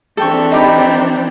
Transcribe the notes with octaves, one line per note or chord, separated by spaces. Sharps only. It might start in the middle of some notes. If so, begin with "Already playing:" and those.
E3 C4 D4 A4 G5 C#6
D#4 G4 B5